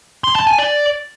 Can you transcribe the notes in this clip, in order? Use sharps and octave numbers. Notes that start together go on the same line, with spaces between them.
C6
A5
G#5
D5